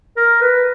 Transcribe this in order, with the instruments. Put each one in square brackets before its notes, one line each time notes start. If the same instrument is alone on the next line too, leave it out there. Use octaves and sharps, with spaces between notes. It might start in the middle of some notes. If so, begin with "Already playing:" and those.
[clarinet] A#4
B4